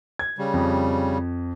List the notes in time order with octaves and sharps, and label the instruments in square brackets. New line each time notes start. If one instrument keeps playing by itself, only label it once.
[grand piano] G#6
[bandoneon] C#3 G3
[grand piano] F2